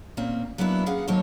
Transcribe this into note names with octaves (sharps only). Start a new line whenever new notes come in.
A#2 A#3 C4 C#4
F#3 A#3 B3 D4 E4
A#3 C#4 G#4 F5 F#5
D#3 F#3 A#3 A4 C5 C#5